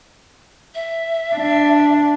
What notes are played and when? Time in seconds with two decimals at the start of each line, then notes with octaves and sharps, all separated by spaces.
0.75 E5
1.35 D4